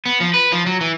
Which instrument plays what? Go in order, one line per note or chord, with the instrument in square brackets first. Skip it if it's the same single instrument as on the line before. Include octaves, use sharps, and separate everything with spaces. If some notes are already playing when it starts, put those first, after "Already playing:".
[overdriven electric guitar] B3
F3
B4
F3
F#3
E3